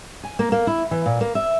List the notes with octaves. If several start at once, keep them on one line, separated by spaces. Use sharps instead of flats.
G#5
A#3
A#3
E4
E3
A#2
A#3
E5